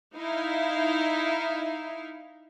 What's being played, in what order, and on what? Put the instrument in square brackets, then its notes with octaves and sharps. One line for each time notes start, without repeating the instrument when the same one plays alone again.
[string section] D#4 E4 F5